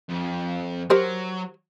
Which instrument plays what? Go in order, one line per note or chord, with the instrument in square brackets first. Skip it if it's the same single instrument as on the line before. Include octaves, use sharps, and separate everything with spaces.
[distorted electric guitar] F2
[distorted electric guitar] F#3 [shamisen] G4 A#4 C5